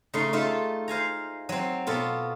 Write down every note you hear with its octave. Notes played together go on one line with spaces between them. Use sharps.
C#3 A3 D#4 C6
D#4 F4 A4 E5
C5 F5 G#5 A#5
F#3 C4
B2 B3 F4 A4